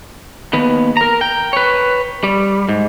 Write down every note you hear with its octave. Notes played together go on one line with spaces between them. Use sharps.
D#2 B3
A#4 A#5
G5
B4 C#5
G3
G#2